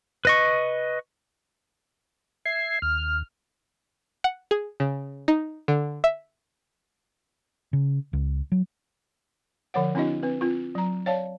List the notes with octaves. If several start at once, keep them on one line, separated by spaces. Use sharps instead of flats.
B4 D#5 C#6
E5 G#6 C7
D#2 F6
F#5
G#4
C#3
D#4
D3
E5
C#3
C#2
F#3
D3 F3 C#5 F#5
C4 D4 E4 F#4 D#5
C4 B4
C4 F4
F#3 A#5
C#5 D5 F5 A5